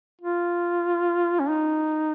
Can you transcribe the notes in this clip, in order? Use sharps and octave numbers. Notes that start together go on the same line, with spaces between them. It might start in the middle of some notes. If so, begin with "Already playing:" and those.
F4
C#4
D#4